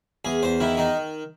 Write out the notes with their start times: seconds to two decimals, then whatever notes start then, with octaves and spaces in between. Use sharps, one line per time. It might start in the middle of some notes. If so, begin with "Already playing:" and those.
0.25 E2 G#4
0.43 E2 C5
0.60 D#3 E4
0.77 D#3 D#4